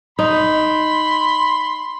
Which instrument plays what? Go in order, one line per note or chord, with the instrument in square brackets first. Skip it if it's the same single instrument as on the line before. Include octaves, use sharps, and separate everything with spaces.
[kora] D#4 [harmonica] B5 C6